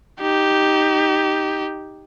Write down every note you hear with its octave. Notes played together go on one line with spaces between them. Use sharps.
D#4 G4